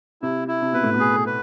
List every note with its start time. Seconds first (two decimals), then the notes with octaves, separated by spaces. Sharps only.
0.22 C3 E4
0.48 E4
0.62 C3
0.73 B2 B4
0.84 A2
0.94 B2
1.00 G#4
1.26 B4